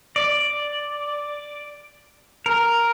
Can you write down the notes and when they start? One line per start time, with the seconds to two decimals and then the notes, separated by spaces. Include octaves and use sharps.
0.16 D5
2.46 A#4